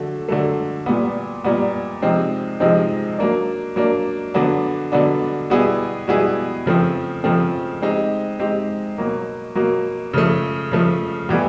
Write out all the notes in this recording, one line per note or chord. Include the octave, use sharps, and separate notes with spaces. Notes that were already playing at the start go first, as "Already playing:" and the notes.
Already playing: D3 F#3 A3
D3 F#3 A3
A#2 G3 B3
A#2 G3 B3
C3 F3 G#3 C4 D#4
C3 F3 G#3 C4 D#4
F#3 A#3 D4
F#3 A#3 D4
D3 F#3 B3 D4
D3 F#3 B3 D4
B2 G3 B3 E4 G#4
B2 G3 B3 E4 G#4
C#3 F3 A3 C4
C#3 F3 A3 C4
G#3 C4 D#4 G4
G#3 C4 D#4 G4
B2 F#3 A#3
B2 F#3 A#3
C#3 F3 A3
C#3 F3 A3
A2 E3 G3 B3